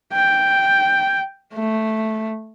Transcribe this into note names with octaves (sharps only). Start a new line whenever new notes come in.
G5
A3